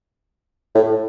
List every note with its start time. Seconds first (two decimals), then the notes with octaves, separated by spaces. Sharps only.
0.75 A2